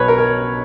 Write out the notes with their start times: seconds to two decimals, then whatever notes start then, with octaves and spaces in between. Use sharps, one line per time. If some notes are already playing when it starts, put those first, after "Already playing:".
Already playing: B1 B2 B4 C#5
0.08 A#4
0.18 A#4